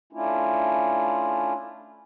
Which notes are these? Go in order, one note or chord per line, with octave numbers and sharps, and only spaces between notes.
A3 C#4 D4 E4 F4